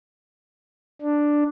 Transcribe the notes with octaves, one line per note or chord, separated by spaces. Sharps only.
D4